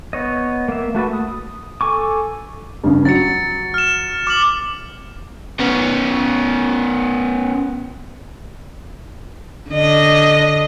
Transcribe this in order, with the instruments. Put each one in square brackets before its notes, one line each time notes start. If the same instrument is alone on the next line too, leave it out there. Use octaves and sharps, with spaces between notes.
[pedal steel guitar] B3 C#5 D#5
A#3 E5
A3 F#4 A4 B4
D#6
A4 G#5 C#6 D6
[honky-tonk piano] G2 C#3
[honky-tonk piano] F#3 [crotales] A6 C#7
[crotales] F6 E7
D6 F6 F#7
[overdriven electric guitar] B3 C#4
[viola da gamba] D3 D#5